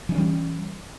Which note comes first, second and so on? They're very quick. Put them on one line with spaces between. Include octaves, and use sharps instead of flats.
E3 D4 C#4 G3